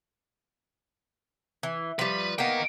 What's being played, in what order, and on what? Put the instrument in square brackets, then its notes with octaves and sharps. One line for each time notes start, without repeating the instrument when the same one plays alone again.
[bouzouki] E3
[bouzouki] F3 G3 [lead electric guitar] B4
[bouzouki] A#3 B3 [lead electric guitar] D#5 G5